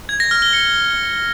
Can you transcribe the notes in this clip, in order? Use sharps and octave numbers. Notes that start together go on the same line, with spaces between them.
G#6
A#6
F6
G7
C#7